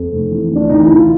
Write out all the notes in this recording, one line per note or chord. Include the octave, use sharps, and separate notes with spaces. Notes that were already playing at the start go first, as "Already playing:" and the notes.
Already playing: F2
F1
E3
D2 D4
E3 D#4
E4
E3
F4